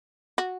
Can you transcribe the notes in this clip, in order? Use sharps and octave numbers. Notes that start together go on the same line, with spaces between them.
F#4